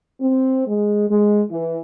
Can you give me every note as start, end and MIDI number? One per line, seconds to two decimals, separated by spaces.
0.20 0.66 60
0.67 1.08 56
1.08 1.41 56
1.50 1.79 52